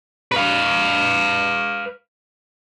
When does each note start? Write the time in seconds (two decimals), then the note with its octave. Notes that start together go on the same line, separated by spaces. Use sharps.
0.32 B4 F5